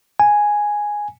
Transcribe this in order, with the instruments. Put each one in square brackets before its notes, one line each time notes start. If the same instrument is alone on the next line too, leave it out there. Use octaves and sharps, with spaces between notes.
[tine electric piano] G#5